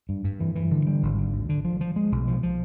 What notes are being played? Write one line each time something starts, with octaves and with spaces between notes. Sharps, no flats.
G2
G2
E3
E3
D3
G3
G#1
D3
D2
D3
F3
F3
G#3
B1
F3
F3